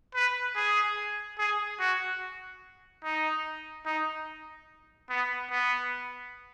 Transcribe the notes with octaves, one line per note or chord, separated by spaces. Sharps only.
B4
G#4
G#4
F#4
D#4
D#4
B3
B3